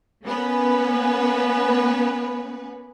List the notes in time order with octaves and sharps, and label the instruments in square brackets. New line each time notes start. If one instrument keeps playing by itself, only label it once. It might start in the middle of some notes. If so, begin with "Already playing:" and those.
[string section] A#3 B3 C#4 B4